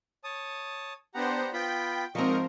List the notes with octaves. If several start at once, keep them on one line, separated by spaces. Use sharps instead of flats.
C#5 A5 D#6
B3 D4 G4 C5 F#5 A#5
B3 F4 G5 B5
G#2 F3 C4 A#4 D#5 C#6